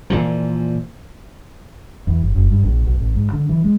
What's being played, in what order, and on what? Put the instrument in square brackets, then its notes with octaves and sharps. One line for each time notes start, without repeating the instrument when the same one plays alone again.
[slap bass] A#2 E3 F3
[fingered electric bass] E2
G1
F#1
G2
A#1
B1
A1
G#2
D3
E3
G#3